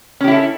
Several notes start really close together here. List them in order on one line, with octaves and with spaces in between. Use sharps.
C#4 G4 E4 A4